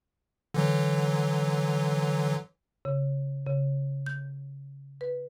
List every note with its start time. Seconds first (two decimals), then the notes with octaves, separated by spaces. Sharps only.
0.54 D3 E3 F#3
2.85 C#3
3.46 C#3
4.06 G6
5.01 B4